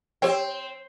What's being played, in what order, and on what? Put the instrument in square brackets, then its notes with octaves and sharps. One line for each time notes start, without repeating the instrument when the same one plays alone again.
[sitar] C4 [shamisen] G4 C#5 G5